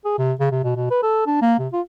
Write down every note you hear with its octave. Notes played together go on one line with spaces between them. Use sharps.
G#4
C3
C#3
C3
B2
B2
B4
A4
D4
A#3
C3
F4